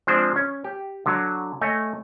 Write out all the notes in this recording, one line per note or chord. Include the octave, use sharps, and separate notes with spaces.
F3 G#3 C4 D4 C5
C#4
G4
D3 F#3
A3 C#5 D#5 G#5